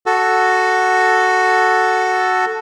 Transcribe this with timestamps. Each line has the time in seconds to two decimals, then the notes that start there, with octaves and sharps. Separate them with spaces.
0.06 F#4 A4